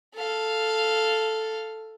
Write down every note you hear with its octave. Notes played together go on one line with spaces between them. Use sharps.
A4 F5